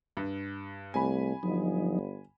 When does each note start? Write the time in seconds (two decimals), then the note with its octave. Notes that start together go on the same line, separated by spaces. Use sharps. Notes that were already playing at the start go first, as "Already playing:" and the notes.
0.17 G2
0.94 C2 A3 G#5 B5
1.43 G1 F3 F#3 D#4